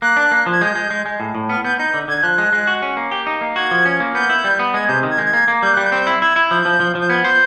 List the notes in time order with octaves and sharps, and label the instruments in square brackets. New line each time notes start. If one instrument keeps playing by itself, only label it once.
[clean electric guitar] A#3 [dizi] F#6
[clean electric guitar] D4
A#3
F3
[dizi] G#6
[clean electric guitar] G#3 [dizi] G6
[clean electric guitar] G#3
G#3
G#3
A2
A2
[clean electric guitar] B3 [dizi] F6
[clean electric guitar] B3 [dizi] G6
[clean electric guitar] D#4 [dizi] G6
[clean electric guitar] D3
[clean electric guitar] D3 [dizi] G#6
[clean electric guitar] F3 [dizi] F#6
[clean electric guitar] G#3
G#3
F#4
C#4
A#3
G4
D#4
A#3
[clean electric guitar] F#4 [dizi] G#6
[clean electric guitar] F3
C#4
A#3
[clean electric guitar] B3 [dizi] G6
[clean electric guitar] E4
G3
B3
[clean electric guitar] G#3 [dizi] G#6
[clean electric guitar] C3 [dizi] G6
[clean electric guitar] D#3
[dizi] G#6
[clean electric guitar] G#3 [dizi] G6
[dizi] G#6
[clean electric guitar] A#3
A#3
[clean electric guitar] G3 [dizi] G6
[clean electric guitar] G3 [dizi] F#6
[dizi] G6
[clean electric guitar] C4
E4
[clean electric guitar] E4 [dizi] G#6
[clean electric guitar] E4
[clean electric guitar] F3 [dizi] G6
[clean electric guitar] F3
F3
F3
[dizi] G6
[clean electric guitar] B3 [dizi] G#6
[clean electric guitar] C5 [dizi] G6